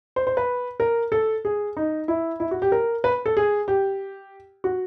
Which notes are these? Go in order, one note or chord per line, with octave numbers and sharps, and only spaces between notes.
C5
C5
B4
A#4
A4
G#4
D#4
E4
E4
F#4
G4
A#4
B4
A4
G#4
G4
F#4